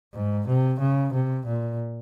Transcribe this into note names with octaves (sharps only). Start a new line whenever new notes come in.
G#2
C3
C#3
C3
A#2